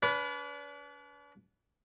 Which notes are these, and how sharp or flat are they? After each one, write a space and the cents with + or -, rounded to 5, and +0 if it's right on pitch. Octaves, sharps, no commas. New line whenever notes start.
D4 -45 B4 +0 D5 -40